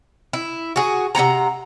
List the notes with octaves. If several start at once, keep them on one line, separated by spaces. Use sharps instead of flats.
E4
F#4 G#4
C3 C#4 F#5 A#5